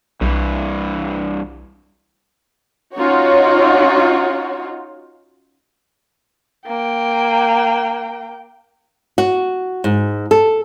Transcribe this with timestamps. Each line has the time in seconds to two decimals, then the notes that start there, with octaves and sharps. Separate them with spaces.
0.21 B1 G2 E3
2.96 C#4 D#4 F4 F#4 C#5
6.67 A#3 G5
9.18 F#4
9.84 G#2
10.31 A4